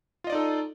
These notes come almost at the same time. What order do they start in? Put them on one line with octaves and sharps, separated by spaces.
F4 D#5 D5 D#4 A4